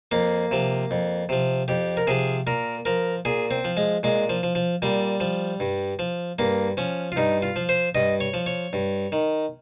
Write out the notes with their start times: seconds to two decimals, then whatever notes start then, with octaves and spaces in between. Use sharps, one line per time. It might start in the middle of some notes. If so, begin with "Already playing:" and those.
0.11 F2 A#3
0.51 C3 F3
0.91 F2
1.29 C3 F3
1.68 F2 G4
1.97 A#4
2.07 C3 F3 G#4
2.47 A#2 A#4
2.85 F3 A#4
3.25 A#2 G#4
3.51 C4
3.65 F3
3.77 G#3
4.03 A#2 G#3
4.29 F3
4.43 F3
4.55 F3
4.82 A#2 G3
5.20 F3
5.60 G2
5.99 F3
6.39 G2 A#3
6.77 F3 C#4
7.12 F4
7.16 G2 D#4
7.42 F4
7.56 F3
7.69 C5
7.95 G2 D#5
8.20 C#5
8.34 F3
8.46 C#5
8.73 G2
9.12 D#3